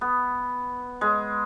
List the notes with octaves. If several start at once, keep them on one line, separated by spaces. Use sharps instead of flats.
B3
G#3